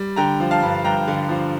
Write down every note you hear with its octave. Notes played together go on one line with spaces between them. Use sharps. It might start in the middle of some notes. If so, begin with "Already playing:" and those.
Already playing: G3
D3 G5 A#5
F3
F5 A5
G2
G2 G5 A#5
D3
F3